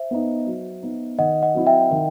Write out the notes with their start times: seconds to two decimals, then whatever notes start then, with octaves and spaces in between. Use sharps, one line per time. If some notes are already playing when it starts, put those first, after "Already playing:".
Already playing: C5 E5
0.11 B3 D#4
0.47 F#3
0.83 B3 D#4
1.19 D#3 D#5 F#5
1.42 D#5 F#5
1.55 F#3 C4 E4
1.66 E5 G5
1.91 D#3